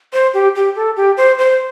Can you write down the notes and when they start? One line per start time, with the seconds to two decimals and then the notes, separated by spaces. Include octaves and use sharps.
0.13 C5
0.34 G4
0.55 G4
0.76 A4
0.97 G4
1.17 C5
1.38 C5